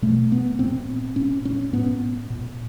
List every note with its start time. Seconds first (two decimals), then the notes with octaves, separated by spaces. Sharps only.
0.02 B2 A3
0.32 B3
0.59 A#2 C4
1.16 A#2 C#4
1.45 C#4
1.73 A2 B3
2.30 A#2